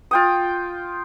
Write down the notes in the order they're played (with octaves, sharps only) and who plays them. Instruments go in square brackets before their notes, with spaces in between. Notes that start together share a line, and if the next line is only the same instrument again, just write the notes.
[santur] F4 G5 D#6